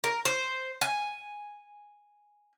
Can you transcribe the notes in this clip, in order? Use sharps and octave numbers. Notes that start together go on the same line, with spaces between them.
A#4
C5
G#5